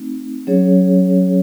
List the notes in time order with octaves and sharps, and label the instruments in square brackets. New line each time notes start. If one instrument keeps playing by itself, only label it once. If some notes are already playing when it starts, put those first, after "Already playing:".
Already playing: [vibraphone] A3 C4 D#4
F#3 C#4 G#4 C#5